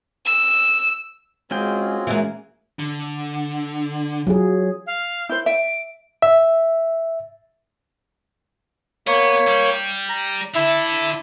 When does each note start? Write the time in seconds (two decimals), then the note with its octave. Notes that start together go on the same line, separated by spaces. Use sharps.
0.25 E6
1.51 G#3 C4 C#4 F4 F#4 G#4 G5
2.07 E3 G#3 A#3
2.79 D3
4.27 F#3 F4 G#4
4.87 F5
5.29 E4 C5 G6
5.46 E5 D7
6.22 E5
9.07 A#3 B3 C#5
9.48 G3
10.09 A#5
10.55 D3 E4 A4 E5